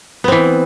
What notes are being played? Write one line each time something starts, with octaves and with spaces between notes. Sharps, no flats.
E3 B3 C4